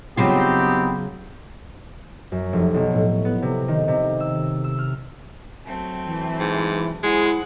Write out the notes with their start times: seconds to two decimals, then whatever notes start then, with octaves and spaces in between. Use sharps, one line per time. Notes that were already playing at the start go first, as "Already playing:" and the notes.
0.17 C#3 F#3 B3 C4 D#4 F4 G4
2.32 F#2
2.53 F1
2.74 B1
2.94 A2
3.25 B3
3.42 C3
3.68 D#3
3.88 C3
4.20 E6
4.64 E6
4.79 F6
5.65 F#3 A3 C4
6.06 E3
6.40 G#2
7.03 G#3 E4 G#4 C5 F#5